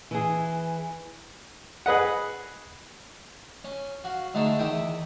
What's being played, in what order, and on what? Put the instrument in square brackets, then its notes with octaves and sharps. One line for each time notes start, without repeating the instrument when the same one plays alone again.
[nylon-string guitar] E3 G#4
[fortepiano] G#4 B4 D#5 F#5
[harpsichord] C#4
F#4 F5
D3 G#3 A3 D4 D#4
E2 D#3 E5 G5 D#6